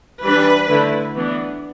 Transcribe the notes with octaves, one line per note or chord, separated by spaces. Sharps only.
E3 G3 D4 B4
D3 A3 E4
E3 B3 D4